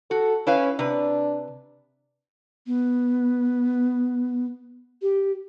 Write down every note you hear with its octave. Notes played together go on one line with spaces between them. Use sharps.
F#4 A4
C#4 E4 B4 F5
C3 D4 B4
B3
G4